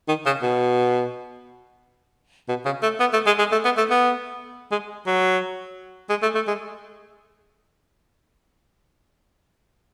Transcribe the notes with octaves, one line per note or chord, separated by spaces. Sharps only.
D#3
C#3
B2
B2
C#3
A3
B3
A3
G#3
G#3
A3
B3
A3
B3
G#3
F#3
G#3
A3
A3
G#3